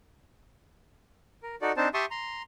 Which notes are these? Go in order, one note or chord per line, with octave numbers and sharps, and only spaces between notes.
A#4
D#4 F#4 A4 D5
C4 D4 D#4 C5 A5
G4 E5 A5 C6 C#6 D#6
A#5 C6